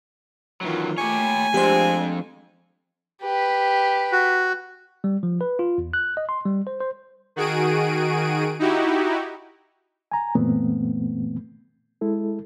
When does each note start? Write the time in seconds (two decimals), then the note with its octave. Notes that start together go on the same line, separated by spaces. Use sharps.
0.61 D#3 E3 F#3 F4
0.98 A3 G4 C#5 G#5
1.54 F2 G#3 C4 D4 G4 C5
3.22 G4 B4
4.12 F#4
5.04 G3
5.23 F3
5.41 B4
5.59 F4
5.78 E2
5.93 F#6
6.17 D#5
6.29 C6
6.45 G3
6.67 C5
6.80 C5
7.36 D#3 F#4 G#4 D7 D#7
8.59 D#4 E4 F#4 G4
10.12 G#5 A#5
10.35 F#2 A#2 E3 A3 B3 C4
12.01 G#3 E4 A4